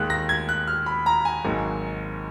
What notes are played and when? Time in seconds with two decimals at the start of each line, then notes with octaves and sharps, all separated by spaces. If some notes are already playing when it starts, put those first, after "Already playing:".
Already playing: D#2 D#3 G#3 F#6
0.10 A#6
0.29 G#6
0.49 F#6
0.67 F6
0.86 B5
1.06 A#5
1.25 G#5
1.44 G#1 G#2 F#3 A#3